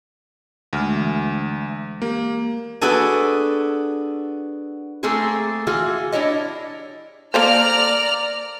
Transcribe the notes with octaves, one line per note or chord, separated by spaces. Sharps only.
D2 G#3 F6
E3
A#3 G4
B3 D4 F#4 G#4 A4 G#5
A3 A#3 C4 G#4 A4
E3 F4 F#4 G#4
D4 E4 G4 C#5 D#5
A#3 A4 C5 D5 A#5 F6